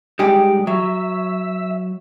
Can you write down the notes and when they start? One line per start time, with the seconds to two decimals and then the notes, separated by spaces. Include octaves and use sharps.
0.19 G3 G#3 D#4 G4
0.67 F#3 E5